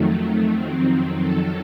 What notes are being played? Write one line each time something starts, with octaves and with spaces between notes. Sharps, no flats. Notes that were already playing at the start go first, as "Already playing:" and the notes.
Already playing: F2 D#3 F#3 A3
F2 D#3 F#3 C4
A4